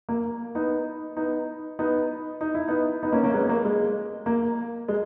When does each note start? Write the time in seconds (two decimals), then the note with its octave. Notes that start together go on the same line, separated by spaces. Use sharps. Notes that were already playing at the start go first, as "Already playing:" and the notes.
0.09 A#3
0.55 B3 D#4
1.17 B3 D#4
1.79 B3 D#4
2.41 D#4
2.55 E4
2.68 B3 D#4
3.03 B3 D#4
3.12 A#3 C#4
3.23 A#3 C#4
3.34 G#3 B3
3.49 A#3
3.65 G#3
4.26 A#3
4.88 G#3